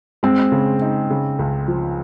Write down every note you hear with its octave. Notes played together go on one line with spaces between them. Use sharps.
G#3 C4
C#3
D#4
C#3
C#2
F3